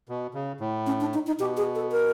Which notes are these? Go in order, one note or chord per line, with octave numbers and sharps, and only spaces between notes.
B2
C#3
A2
C#4
D4
D#4
D#4
B2 G4
G#4
A4
A#4